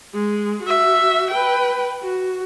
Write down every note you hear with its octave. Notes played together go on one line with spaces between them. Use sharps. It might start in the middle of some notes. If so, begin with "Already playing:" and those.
G#3
F#4 E5
B4 G5
F#4